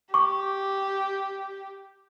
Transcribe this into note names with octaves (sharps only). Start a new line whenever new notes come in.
G4 C#6 D6